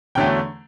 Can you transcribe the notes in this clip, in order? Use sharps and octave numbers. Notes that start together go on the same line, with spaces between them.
E2 D3 F#3 A3 G5